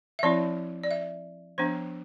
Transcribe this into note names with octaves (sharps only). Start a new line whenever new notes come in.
E5
F3 C4 E4 D5
D5
E5
F3 B3 D4 C5